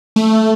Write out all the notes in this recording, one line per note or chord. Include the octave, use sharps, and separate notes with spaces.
A3